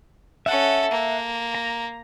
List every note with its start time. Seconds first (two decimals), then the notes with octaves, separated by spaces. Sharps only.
0.46 C#4 A4 E5 F#5
0.91 A#3
1.55 A#5